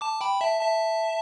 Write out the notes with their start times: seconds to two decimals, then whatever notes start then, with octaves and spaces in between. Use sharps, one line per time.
0.01 A5 D6
0.21 G5 B5
0.41 E5 A5
0.60 E5 A5